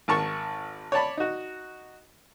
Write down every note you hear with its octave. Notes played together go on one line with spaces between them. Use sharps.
G#1 A#4 A5 C#6
C#5 D5 A5 B5
D#4 F#4